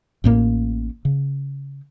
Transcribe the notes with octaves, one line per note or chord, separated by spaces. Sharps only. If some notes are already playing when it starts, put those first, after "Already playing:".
A1 A2 A#3
C#3